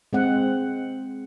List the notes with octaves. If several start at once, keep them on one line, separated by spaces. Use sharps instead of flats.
G#3 C4 F#5